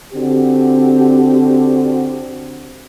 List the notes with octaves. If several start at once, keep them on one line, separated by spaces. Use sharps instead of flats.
D3 C4 F#4 G4